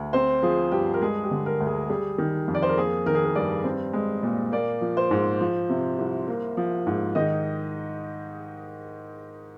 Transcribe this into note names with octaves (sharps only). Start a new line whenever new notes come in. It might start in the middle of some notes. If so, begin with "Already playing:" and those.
Already playing: D2
C4 C5
F3 G#4
G2 G4
A#4
G#3 G#4
G4
D3
A#4
D2
G#4
G3 G#4
D#3
F2
D5
C5
A#4
A#3 G#4
D#3 A#4
G#4
A#4
G2 D5
C4
G#3
A#2
A#3 D5
F3
C5
G#2
F3
C3
C2
A#3
F3
G#2
D#3 D#5